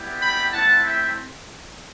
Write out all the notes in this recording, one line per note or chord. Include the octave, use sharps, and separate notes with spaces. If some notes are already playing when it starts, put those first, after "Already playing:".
Already playing: G3 B3 E4 G4
G5 B5
A3 C4 E4 F#5 A5
E5 G5